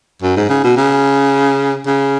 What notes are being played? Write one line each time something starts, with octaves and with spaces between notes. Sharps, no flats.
F#2
G#2
C#3
B2
C#3
C#3